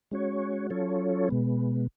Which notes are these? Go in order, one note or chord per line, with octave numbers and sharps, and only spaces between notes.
G#3 C#4 F#4 C#5
F#3 C#4 F4 A4 C#5
B2 G#3 B3